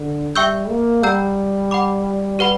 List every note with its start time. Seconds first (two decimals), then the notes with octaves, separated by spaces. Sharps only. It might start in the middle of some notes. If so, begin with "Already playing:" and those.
Already playing: D3
0.35 G3 E5 G5 C#6 E6 G6
0.69 A#3
1.03 G3 F#5 A#5 E6 G6
1.71 F#5 B5 D6
2.39 G4 B4 F#5 B5